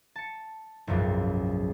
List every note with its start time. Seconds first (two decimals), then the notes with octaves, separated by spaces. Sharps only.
0.16 A5 C#7
0.87 F#1 B1 F2 G#2